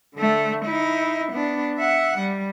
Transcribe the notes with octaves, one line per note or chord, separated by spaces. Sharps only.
D3 A3
D#4 E4
B3 D4
E5 F#5
G3